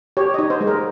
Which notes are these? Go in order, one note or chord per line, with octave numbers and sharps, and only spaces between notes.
G4 C#5
D#4 D#5
C5
G#3
A#4